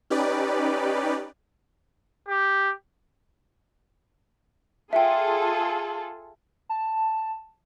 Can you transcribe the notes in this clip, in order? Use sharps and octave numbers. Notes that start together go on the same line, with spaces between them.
C#4 D#4 G4 B4 D5
G4
F4 G#4 A4 E5 G5
A5